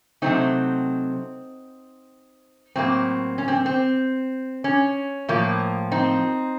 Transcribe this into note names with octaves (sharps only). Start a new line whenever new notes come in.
C3 F#3 A3 C4 D#4
A2 F#3 A#3 C4
C#4
C4
C4
C#4
A2 F3 A#3
C4 D#4